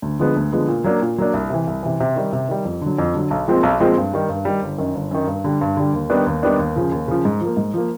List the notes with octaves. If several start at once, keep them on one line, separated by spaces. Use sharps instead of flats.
D2
D3 F3 G#3 B3
D2
D3 F3 G#3 B3
A#2
F#3 A#3 D4
A#2
F#3 A#3 D4
C2
C3 E3
C2
C3 E3
C3
D#3 G3
C3
D#3 G3
F2
D3 F#3
F2
D3 F#3
B1
A#2 F3 G#3 C4
B1
A#2 F3 G#3 C4
G2
D#3 G3
G2
D#3 G3
G1
F#2 D#3
G1
F#2 D#3
G2
D3 G3
G2
D3 G3
D#2
D#3 G3 B3 D4
D#2
D#3 G3 B3 D4
D#2
C#3 F3
D#2
C#3 F3
G#2
F3 A#3
G#2
F3 A#3